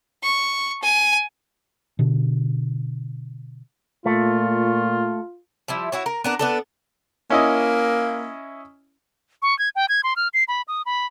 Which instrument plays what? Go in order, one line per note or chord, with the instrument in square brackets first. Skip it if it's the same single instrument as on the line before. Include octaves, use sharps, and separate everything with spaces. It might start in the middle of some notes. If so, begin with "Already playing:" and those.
[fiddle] C#6
G#5
[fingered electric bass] B2 D3
[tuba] A#2 [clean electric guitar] A3 [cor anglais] F4
[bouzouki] F3 G3 E4
E4 F#4 C#5
A#4
B3 D4 A#4
B3 D4 A4
[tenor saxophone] A#3 [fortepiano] C#4 E4 D#5
[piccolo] C#6
G#6
G5
G#6
C6
F6
C7
B5
D#6
B5